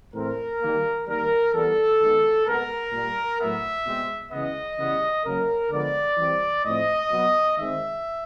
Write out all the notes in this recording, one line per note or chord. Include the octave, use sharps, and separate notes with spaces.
A2 E3 A3 C4 A#4
D#3 G3 A#3
D#3 G3 A#3 A#4
E3 G3 B3 A4
D#3 G#3 B3
B2 G#3 B3 A#4
A#2 G3 A#3
A2 F#3 B3 E5
B2 G#3 C4
C#3 E3 G#3 B3 D#5
C#3 E3 G3 B3
C#3 F#3 A#3 A#4
D3 F3 G#3 B3 D5
E3 G3 C4
A2 F3 A3 C4 D#5
B2 F#3 B3
D#3 G#3 C4 E5